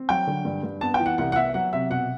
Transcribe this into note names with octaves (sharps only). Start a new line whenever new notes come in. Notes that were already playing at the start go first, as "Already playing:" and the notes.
Already playing: C4
F#3 G5
D3
G2
G2
B3 A5
G5
E3
F#5
C2 F#5
F#5
B3 E5
F#3 F#5
C3 E5
B2 F#5